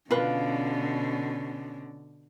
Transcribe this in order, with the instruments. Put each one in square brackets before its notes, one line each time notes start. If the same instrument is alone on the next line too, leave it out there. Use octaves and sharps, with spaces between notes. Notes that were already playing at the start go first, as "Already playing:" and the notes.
[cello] B2 D3 [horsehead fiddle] C#4 [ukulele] F4 B4